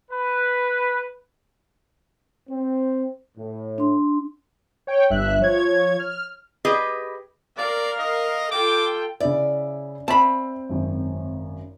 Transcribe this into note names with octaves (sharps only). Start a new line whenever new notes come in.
B4
C4
A2
D4 C6
C#5 G5
G1 G2 E5 F#6
F3 C#5 G#6
F6
G4 G#4 B4 D#5
A#4 D5 F5
D#5
F4 A4 G5 D6
C#3 E4 D5 E5
C4 E5 A5 B5
G#1 F#2